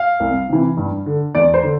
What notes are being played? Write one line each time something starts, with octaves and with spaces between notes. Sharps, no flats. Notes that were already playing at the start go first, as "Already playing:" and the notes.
Already playing: F5
C2
C3 E3
G2
D3
E2 D5
C5
D3